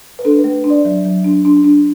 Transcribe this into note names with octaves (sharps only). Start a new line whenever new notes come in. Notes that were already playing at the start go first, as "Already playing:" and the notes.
B4
D4 A4
B4
A3
D4
D5
F#3
F#3
D4
D4
D4